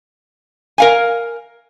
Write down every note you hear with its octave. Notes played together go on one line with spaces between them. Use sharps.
A#4 F5 G#5